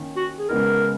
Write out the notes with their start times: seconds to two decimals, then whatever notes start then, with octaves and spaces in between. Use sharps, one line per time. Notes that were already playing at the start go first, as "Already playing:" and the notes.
Already playing: D#3 A#3 C#4
0.16 F#4
0.39 G#4
0.49 C#3 G#3 B3 D#4 A#4